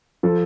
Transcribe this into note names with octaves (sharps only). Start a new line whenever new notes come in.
F3 A4